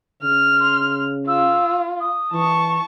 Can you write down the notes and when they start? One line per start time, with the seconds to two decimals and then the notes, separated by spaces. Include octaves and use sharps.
0.23 C#3 F6
0.60 C6
1.28 F4 E6
2.00 D#6
2.33 E3 A5 C#6